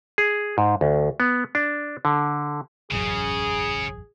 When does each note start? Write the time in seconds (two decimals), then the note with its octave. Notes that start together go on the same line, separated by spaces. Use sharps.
0.18 G#4
0.58 G#2
0.81 D2
1.20 B3
1.55 D4
2.05 D3
2.92 E1 A1 F#2 C#3 G#4